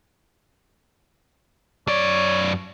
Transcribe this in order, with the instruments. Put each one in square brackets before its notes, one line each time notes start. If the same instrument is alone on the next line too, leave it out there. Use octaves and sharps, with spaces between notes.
[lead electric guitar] F#2 D5 [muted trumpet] C#5